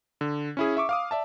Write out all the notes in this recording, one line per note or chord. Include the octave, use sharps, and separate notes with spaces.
D3
C#4 E4 G#4
E5 C#6 D6
F5 D6 D#6
D5 E5 A5